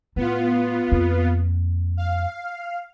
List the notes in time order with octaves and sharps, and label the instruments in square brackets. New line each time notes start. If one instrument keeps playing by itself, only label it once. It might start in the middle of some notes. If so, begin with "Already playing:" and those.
[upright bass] A2 [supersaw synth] B3 F4
[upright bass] F2 A#3
[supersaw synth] F5